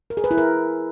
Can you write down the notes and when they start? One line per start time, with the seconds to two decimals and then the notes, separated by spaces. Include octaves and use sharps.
0.10 A#4
0.17 G#4
0.24 B4
0.31 E4
0.38 A#4